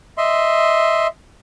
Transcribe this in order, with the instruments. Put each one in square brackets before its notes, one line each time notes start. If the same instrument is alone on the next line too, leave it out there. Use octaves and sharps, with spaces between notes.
[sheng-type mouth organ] D#5 E5 C6